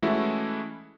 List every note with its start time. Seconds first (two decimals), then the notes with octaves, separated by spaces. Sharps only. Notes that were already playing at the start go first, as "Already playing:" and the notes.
0.02 E3 G#3 A3 C#4 E4 F#4